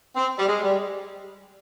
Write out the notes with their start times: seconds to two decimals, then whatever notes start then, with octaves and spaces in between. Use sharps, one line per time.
0.16 C4
0.37 G3
0.47 G#3
0.62 G3